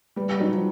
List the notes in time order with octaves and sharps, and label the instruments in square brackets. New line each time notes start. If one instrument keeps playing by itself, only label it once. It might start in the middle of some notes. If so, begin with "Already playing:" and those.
[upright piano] G3 [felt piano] B4
[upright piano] G3
[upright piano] F#3 [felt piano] D#4
[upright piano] F3